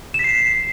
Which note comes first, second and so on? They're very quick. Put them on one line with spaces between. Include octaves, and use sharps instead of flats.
E7 B6 C7